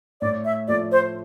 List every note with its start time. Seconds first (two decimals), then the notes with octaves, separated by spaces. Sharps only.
0.21 A2 D5
0.45 E5
0.68 F3 A3 D5
0.92 C5